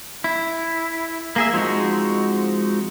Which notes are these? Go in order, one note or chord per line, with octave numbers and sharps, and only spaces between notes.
E4
A#3 G#4 E5
F3 G#3 C4 D#4 F#4